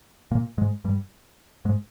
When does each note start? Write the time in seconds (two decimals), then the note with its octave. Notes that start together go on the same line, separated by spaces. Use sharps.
0.31 A#2 A#3
0.58 G#2 G#3
0.84 G2 G3
1.65 G#2 G#3